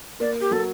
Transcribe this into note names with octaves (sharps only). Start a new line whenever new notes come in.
A#3 D5
G4
F#3 A4